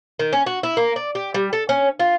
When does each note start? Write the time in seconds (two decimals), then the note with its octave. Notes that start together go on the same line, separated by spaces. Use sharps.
0.19 D#3
0.33 C#4
0.46 F#4
0.63 E4
0.77 A#3
0.96 D5
1.15 G4
1.34 G3
1.53 A4
1.69 C#4
2.00 F4